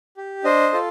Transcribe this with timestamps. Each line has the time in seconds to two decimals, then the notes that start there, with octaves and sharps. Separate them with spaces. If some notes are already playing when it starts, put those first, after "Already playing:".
0.17 G4
0.44 D4 C5 D#5
0.73 F4 A4